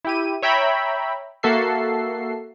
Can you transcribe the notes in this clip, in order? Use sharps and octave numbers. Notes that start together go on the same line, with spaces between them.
E4 G4 D#7
C#5 E5 G5 A#5 B5
A#3 F#4 A4 E5 C7